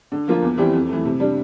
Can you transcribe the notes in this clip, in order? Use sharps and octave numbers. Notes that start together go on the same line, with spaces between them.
D3
F3 A#3 F4
E2
E3 G3 C4 G4
F2
E3 A3
C3
G3 D4